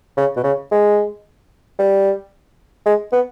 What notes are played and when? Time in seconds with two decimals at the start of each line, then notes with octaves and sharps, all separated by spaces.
0.17 C#3
0.37 B2
0.44 C#3
0.71 G#3
1.79 G3
2.86 G#3
3.12 B3